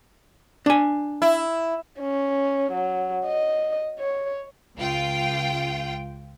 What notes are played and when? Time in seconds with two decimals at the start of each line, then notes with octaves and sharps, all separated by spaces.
0.66 D4 G#5
1.22 E4
2.00 C#4
2.72 F#3
3.26 D#5
3.99 C#5
4.78 C#2 F4 G5